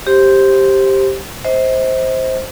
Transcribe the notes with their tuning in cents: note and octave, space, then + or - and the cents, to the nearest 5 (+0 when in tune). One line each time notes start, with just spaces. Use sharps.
G4 +0 C5 +15 C6 -5
C5 +0 D#5 +45